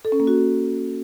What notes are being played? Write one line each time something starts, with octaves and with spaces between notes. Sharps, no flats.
A4
C#4
A#3
F#4